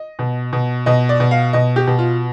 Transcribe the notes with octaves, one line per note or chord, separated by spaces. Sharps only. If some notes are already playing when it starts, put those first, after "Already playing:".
Already playing: D#5
B2
B2
B2 D#5
D5
B2
F5
B2 D#5
G4
B2
F4